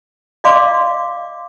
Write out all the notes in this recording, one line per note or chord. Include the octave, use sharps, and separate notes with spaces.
D5 D#5 F5 C6 D6